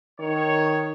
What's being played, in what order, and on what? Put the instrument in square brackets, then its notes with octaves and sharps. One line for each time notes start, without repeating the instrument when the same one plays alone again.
[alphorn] D#3 [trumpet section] C#5